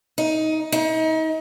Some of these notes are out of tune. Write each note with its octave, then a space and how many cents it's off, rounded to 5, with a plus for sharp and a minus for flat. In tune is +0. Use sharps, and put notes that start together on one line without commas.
D#4 +15
D#4 +35